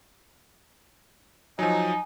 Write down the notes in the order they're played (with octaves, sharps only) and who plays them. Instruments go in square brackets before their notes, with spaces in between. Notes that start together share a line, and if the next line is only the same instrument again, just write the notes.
[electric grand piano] F3 F#3 [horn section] D#4 [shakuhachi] G#5